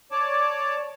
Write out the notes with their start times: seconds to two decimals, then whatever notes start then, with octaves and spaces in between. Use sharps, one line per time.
0.11 C#5 D5 A5 D6